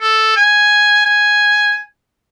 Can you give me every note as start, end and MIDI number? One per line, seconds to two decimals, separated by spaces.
0.01 0.33 69
0.36 1.01 80
1.05 1.80 80